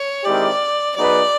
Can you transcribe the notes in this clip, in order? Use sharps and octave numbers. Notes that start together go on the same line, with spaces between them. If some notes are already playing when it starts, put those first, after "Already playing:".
Already playing: C#5
D#3 G#3 C4 E4 G4 D5
F#3 B3 D#4 G#4 B4 D5